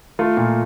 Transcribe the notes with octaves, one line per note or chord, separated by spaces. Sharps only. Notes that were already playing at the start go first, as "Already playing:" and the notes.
A3 F4
A#2